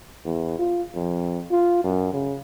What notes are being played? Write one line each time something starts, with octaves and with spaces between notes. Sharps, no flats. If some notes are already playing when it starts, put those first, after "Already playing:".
E2
F4
F2
F4
F#2
C#3